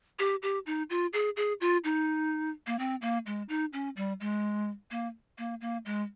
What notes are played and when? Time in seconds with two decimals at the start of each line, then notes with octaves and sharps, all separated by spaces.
0.19 G4
0.43 G4
0.66 D#4
0.90 F4
1.13 G#4
1.37 G#4
1.61 F4
1.84 D#4
2.67 A#3
2.79 C4
3.02 A#3
3.26 G#3
3.49 D#4
3.73 C#4
3.96 G3
4.20 G#3
4.91 A#3
5.38 A#3
5.61 A#3
5.85 G#3